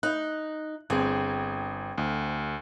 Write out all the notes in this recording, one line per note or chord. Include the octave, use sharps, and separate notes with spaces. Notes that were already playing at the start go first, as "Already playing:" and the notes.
D#4 F#6
G1 C4 G#4
D2